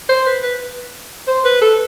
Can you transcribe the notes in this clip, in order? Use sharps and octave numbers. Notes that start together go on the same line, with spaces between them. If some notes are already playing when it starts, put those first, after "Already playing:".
C5
B4
B4
C5
B4
A4